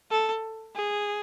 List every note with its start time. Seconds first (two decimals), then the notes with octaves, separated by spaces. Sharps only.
0.11 A4
0.75 G#4